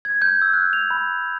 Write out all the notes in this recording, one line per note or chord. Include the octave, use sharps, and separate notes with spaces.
G#6
G6
E6
F#6
F7
B5